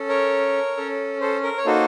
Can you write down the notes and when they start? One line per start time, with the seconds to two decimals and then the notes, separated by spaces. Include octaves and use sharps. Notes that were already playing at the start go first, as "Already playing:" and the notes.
Already playing: C#4 A4
0.09 A#4 C#5
0.77 C#4 A4
1.21 A4 C5
1.43 A#4
1.58 C#5
1.66 A#3 D#4 F#4 A4 C5